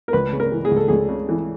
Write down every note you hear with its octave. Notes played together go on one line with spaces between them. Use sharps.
A#4
C#2 B4
C#3
A#4
E3
G#4
C#2
A4
C#2 G#4
C#3
E3